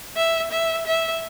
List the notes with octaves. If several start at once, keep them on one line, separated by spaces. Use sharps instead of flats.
E5
E5
E5